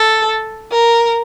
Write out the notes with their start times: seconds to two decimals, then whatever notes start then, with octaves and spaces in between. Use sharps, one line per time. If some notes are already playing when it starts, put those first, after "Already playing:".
Already playing: A4
0.71 A#4